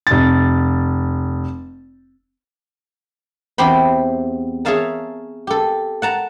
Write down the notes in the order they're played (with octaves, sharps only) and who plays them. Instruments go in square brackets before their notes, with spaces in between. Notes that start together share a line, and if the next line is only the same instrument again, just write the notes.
[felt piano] F1 A6
[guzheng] E2 C4 G4 C5 B5
G#4 C#5 E5 F5 A5 A#5
G4 A4
F#5 A5 A#5